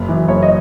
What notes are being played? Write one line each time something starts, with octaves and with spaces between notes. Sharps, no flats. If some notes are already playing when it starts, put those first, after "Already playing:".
Already playing: F#1
F#2 E3
F#1 C#5
D#5